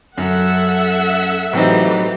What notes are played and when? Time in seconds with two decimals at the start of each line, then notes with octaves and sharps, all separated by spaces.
0.18 F#2 A4 E5 F#5
1.53 A2 E3 F#3 C4 D#4 G4